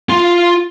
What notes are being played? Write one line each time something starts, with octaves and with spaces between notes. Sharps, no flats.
F4